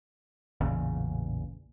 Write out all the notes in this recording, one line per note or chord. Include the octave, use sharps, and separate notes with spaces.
A1 E2 A#2 C#3